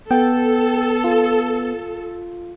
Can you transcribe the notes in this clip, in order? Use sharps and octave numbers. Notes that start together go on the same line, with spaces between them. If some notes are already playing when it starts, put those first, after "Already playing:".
B3 A4 G5
F4